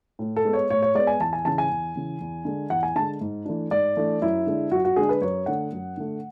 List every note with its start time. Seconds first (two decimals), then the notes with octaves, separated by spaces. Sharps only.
0.19 A2
0.36 A4
0.45 G#3 B3
0.53 C#5
0.70 A2 C#5
0.82 C#5
0.95 G#3 B3 D5
1.07 G#5
1.20 E2 A5
1.33 G#5
1.45 C#3 E3 A5
1.58 G#5
1.70 E2
1.96 C#3 E3
2.21 E2
2.45 D3 G#3
2.70 E2 F#5
2.83 G#5
2.95 D3 G#3 A5
3.21 G#2
3.45 E3 A3 D4
3.71 G#2 D5
3.97 E3 A3 D4
4.22 F#2 E4
4.47 D3 G#3 D4
4.71 F#2 F#4
4.85 F#4
4.96 D3 G#3 D4 G#4
5.09 B4
5.21 F#2 C#5
5.46 D3 A3 F#5
5.72 F#2
5.97 D3 A3